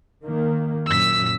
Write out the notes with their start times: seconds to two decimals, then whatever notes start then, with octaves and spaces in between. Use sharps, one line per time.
0.24 D#3 A#3
0.87 F#2 A#2 E6 B6